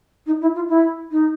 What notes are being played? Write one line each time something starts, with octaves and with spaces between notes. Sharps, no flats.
D#4
E4
F4
E4
D#4